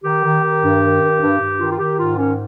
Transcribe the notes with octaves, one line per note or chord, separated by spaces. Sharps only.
D#3 G4
D#3
D#3
G2
D#3
G2
G2
G2
D#3 F4
F4
D#3 G4
G#2 F4
D#3 C#4